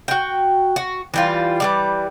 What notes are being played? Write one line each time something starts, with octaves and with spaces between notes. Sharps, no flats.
F#4 G5
F#4
E3 G3 F4
E3 G3 D5